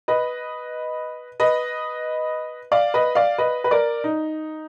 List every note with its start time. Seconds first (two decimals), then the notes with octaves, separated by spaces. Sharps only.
0.08 B4 D#5
1.40 B4 D#5
2.72 D5 F5
2.94 B4 D#5
3.15 D5 F5
3.38 B4 D#5
3.64 B4
3.71 A#4 D5
4.04 D#4